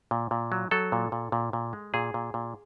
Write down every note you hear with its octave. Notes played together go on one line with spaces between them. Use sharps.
A#2
A#2
F#3
F#3 A4
A#2
A#2
A#2
A#2
G#3
A#2 G#4
A#2
A#2